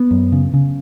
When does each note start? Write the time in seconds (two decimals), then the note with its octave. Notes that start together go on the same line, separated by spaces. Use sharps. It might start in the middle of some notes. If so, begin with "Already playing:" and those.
Already playing: B3
0.11 F#2
0.32 C#3
0.54 C#3